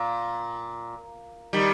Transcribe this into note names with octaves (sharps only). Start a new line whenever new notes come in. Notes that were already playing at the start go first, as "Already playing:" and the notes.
Already playing: A#2
D#3 G3